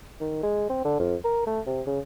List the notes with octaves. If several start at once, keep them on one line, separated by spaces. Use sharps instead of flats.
D#3
G#3
C4
D3
F2
A#4
A3
C3
C#3